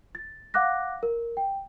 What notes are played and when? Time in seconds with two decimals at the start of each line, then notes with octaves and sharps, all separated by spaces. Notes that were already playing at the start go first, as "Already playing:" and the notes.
0.15 A6
0.54 F5 F#5 D6 F#6 A#6
1.03 A#4
1.37 G5